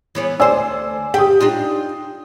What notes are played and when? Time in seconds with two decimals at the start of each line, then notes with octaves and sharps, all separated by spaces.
0.15 E3 B3 C#5
0.40 D2 C5 D5 G#5 E6
1.14 G4 G5 D#6
1.41 D4 D#4 F4